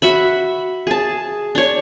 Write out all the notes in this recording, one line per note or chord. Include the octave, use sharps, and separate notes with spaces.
F#4 E5 B5
G#4 A5
D4 C#5